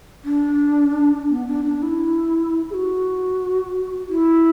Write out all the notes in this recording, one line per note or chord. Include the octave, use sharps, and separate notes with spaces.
D4
B3
D4
D4
E4
G#4
F#4
E4